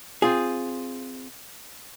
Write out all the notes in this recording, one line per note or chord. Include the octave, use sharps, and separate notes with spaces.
C4 F4 G#4